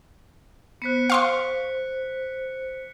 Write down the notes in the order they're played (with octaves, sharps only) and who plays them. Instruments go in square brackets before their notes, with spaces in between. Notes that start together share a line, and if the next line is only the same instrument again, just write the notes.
[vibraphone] B3 C5 [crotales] F#6 B6 C#7
[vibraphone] C5 [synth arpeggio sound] F5 C6 C#6